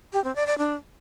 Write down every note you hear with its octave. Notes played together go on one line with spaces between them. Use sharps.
G4
C4
D5
D5
D4